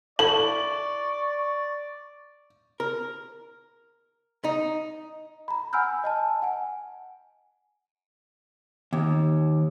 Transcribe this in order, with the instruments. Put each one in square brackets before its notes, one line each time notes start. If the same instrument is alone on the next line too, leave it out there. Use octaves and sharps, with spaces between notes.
[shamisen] E4 A4 [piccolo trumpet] D5 [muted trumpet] C#6 [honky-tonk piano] F#7
[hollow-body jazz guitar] A#4
D#4
[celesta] A#5 B5
F#5 G#5 B5 E6 F6 G6
D#5 G#5 A5
F#5 G#5
[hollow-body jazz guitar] D#2